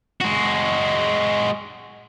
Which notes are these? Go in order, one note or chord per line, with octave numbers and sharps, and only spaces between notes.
G#3 F#4